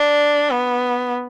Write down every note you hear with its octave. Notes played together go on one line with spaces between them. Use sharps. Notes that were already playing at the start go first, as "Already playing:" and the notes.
Already playing: D4
B3